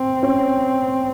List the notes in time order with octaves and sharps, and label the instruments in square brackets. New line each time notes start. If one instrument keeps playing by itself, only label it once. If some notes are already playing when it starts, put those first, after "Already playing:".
Already playing: [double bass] C4
[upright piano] C#4